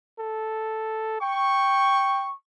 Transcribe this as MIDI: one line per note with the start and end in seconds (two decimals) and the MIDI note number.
0.19 1.19 69
1.21 2.29 79
1.21 2.32 85